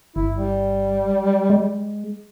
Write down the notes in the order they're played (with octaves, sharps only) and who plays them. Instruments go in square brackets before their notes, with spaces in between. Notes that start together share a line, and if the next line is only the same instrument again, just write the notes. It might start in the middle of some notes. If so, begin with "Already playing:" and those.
[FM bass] G1 [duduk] E4
[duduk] G3
[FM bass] G#3